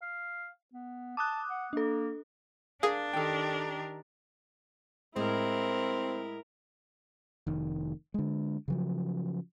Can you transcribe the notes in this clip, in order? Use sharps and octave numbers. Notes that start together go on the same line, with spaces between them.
F5
B3
A5 D6 D#6 F#6
F#5
A#3 D4 A4
D4 G#4 A#4 F5
D#3 G4 A4 A#4 G5
A2 G#3 C4 E4 A#4
F1 D#3
D3 G#3
C#3 F3 F#3